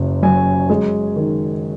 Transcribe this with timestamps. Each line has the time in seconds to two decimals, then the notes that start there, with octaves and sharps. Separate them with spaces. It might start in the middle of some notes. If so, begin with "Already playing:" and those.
Already playing: F#1 F#2
0.22 F#3 G#5
0.70 G#3
1.16 D#3